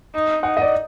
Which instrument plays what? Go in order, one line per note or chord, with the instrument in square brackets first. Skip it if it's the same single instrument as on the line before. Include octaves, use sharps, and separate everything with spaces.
[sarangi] D#4
[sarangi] D#4 [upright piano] F#5
[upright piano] D#5
D5